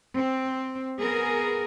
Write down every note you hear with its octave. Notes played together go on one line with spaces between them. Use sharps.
C4
B3 G#4 A#4